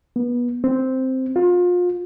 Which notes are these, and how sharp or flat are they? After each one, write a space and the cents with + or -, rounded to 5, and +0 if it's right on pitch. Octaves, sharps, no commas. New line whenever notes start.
B3 -25
C4 -5
F4 +30